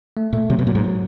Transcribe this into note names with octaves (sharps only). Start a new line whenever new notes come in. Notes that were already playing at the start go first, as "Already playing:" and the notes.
A3
A#2 A3
C3 F#3
B2
A#2 F#3
G#2
F#3